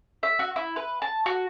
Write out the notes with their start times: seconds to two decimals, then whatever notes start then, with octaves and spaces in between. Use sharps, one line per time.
0.23 E5
0.39 F#4
0.56 E4
0.76 B4
1.02 A5
1.26 F#4